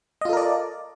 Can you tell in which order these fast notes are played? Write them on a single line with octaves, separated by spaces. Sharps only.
D#5 F4 A4 A#4 D5